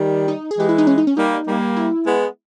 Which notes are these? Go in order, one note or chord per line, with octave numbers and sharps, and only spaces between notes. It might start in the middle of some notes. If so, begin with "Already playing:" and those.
Already playing: D#3 G3
D#4
G#4
E3 G#3 G4
E4
D#4
C#4
D#4
C#4
G3 A#3 D#4
G3 A#3
E4
G#3 B3